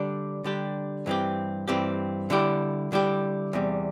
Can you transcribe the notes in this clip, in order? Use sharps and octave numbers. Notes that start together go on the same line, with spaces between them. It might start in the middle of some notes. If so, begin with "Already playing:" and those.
Already playing: D3 G3 D4 G4
D3 G3 D4 G4
G2 E3 C4 G4
G2 E3 C4 G4
D3 G3 E4 G4
D3 G3 E4 G4
E2 C3 G3